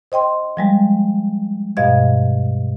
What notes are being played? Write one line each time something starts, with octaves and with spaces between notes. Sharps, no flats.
C5 D#5 G5 C6
F3 G3 G#3
G2 B2 D#5 F5 G#6